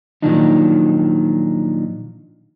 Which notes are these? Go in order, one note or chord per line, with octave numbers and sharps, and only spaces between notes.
A#2 D#3 F3 F#3 D4 D#4